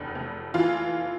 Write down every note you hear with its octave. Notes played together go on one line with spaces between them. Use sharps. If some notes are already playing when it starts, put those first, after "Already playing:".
Already playing: F1 E2 D3
F1
E3 F4